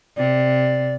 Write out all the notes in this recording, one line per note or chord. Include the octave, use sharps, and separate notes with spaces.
C3 D5